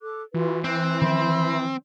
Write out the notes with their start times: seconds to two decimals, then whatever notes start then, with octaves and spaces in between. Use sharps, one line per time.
0.01 A4 D6 F#6
0.34 E3 F4 F#4 B4
0.64 C4 F#6
1.02 D#3 F3 C#4 E5 B5 C6